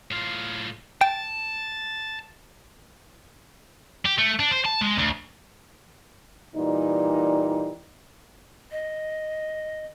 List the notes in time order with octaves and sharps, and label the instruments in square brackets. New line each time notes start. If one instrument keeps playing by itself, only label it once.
[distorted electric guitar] A2 F4
[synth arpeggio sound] G5 [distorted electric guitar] A5
[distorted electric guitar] G4
A3
D4
C5
A5
G#3
D2
[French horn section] A#2 E3 G3 D#4
[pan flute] D#5